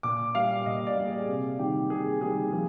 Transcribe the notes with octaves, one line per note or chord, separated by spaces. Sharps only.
A#2 D6
G3 A#3 F5
A#2 D#5
D5
G3 A#3
G#4
C3
D#3 G3 A#3 G4
C3 G#4
D#3 G3 A#3 G#4
F3 G#4